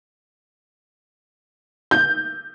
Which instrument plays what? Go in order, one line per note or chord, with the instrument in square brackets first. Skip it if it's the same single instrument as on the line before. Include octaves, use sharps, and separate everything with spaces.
[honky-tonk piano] G6